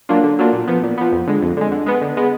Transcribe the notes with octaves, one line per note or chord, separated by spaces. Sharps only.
F#3 A#3 D4 F4
D3
F#3 A#3 D4 F4
A#2
F3 B3
A#2
F3 B3
F2
D3 G#3
F2
D3 G#3
D3
G#3 B3
D3
G#3 B3